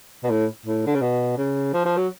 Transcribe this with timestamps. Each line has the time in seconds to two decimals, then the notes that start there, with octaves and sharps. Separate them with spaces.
0.23 B2
0.30 A2
0.66 A2
0.86 D3
0.95 C#3
1.01 B2
1.37 C#3
1.74 F3
1.85 F3
1.97 F#3